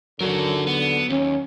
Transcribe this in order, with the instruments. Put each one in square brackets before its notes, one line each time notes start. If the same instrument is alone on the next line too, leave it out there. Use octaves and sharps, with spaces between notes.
[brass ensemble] D#2 D3 [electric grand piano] F#3 [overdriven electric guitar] F#4 A#4
[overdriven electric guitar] B3
[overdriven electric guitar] D#2 [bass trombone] C#4